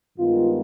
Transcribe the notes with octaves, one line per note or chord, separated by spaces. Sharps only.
G2 D#3 G#3 B3 F4